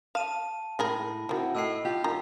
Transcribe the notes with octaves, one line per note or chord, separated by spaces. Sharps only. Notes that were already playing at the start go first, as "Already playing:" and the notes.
F5 A5 D#7
A2 D#3 G#3 A#4 B5 A#6
D#3 A#3 C4 E4 F#4
A2 D#5 E6 C7
F4 G4
F#2 D#3 F4 A#5